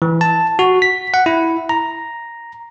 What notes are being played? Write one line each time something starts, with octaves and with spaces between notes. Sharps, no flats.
E3
A5
F#4
B6
F#5
E4
A#5